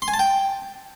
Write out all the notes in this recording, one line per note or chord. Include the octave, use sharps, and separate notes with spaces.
C6
G#5
A5
G5